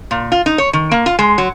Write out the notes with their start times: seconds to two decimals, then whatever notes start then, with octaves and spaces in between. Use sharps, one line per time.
0.11 A#2
0.32 F4
0.46 D#4
0.58 C#5
0.73 D#3
0.91 A#3
1.06 F4
1.19 G#3
1.38 F#3